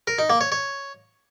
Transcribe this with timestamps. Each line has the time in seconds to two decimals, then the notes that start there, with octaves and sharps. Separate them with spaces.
0.07 A#4
0.19 D#4
0.30 A#3
0.41 C#5
0.52 C#5